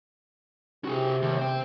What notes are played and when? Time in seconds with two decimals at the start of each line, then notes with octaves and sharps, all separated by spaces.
0.85 C3 F#4 G#4
1.22 D#2
1.38 C5 G5